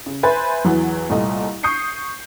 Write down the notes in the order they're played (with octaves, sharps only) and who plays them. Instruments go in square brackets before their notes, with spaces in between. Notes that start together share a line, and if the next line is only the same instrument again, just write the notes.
[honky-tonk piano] C#3
B4 C5 E5 G#5 B5 A6
E2 E3 F#3
C2 A#2 A3 D#5
C#6 D#6 G6 C7 C#7